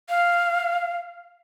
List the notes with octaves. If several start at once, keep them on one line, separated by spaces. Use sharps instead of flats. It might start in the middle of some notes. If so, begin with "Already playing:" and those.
F5